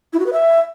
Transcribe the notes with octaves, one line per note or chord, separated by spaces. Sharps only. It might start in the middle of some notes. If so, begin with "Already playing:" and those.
E4
F#4
B4
E5